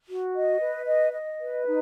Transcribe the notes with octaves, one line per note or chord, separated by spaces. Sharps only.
F#4
D#5
B4
D#5
D#5
B4
D#4